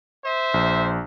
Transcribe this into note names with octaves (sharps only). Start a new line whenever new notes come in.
C5 E5
A#1